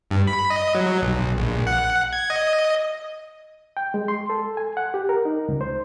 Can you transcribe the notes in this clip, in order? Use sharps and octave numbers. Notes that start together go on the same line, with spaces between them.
G2
B5
D#5
F#3
B1
A#1
F#5
G#6
D#5
G5
G#3
C6
A4
G#5
F#5
G4
A#4
D#4
C#2
C5